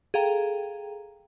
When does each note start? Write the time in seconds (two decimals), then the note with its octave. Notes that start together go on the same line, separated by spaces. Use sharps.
0.14 G#4 A4 F5 G5 A#5